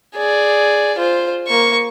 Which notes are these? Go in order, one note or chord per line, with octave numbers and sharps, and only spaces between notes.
G#4 D5
F4 C5
A#3 C#6